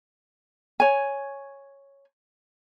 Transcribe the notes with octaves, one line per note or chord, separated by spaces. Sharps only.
C#5 G#5